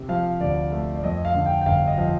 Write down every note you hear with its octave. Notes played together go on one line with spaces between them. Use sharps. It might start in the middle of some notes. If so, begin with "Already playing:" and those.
Already playing: C3
F3 F5
D2 D5
A3
D5
F2 D#5
F5
D3
G5
G5
G1 F5
D#5
F3